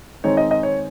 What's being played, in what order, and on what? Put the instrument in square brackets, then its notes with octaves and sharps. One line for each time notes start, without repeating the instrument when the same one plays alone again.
[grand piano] D#3 G#3 C4 D#4 C#5
D#5
D#5
C#5